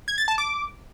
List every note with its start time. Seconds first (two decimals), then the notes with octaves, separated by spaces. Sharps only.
0.08 G#6
0.18 A6
0.28 A5
0.38 D6